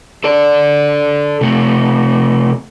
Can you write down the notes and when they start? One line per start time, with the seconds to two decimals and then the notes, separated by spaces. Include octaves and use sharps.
0.24 A4 D5
1.41 C3 A3